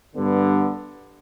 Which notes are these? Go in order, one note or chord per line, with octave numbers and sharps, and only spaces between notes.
G2 D3 B3